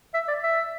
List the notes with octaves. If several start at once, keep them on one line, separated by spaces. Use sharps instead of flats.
E5
D5
E5